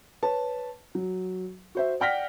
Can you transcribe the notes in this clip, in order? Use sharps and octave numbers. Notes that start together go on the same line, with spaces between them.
B4 C#5 A5
F#3
F#4 C5 E5
D5 F#5 G5 F6 A#6 B6